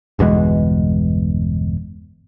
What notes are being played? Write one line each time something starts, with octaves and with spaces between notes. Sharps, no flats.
G1 E2 B2 G#3